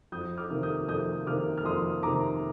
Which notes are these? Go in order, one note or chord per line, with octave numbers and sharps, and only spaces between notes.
F2 D#6 G6
D6 F6
C3 D#3 A#3
D#6 G6
F2 D#6 G6
C3 D#3 A#3 D6 F6
F6
F2 C6 D#6
C3 D#3 A#3 A#5 D6